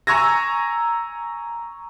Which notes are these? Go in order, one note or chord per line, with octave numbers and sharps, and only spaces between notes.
G#5 A#5 C#6 E6 G#6 A#6